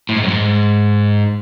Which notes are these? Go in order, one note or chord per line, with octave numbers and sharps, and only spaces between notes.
A2
G#2
F#2
G#2